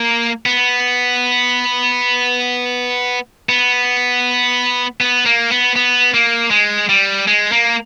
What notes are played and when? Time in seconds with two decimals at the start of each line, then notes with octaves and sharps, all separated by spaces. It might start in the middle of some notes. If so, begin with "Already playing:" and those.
Already playing: A#3
0.46 B3
3.49 B3
5.01 B3
5.26 A#3
5.51 B3
5.76 B3
6.14 A#3
6.51 G#3
6.89 G3
7.27 G#3
7.52 A#3